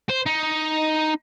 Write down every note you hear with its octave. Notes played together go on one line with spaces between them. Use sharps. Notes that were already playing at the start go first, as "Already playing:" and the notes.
C5
D#4